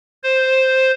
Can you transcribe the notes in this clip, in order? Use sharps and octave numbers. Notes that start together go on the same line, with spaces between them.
C5